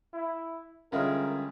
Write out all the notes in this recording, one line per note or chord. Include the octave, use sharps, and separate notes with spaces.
E4
G2 D3 G#3 C#4 F4 A#4 E5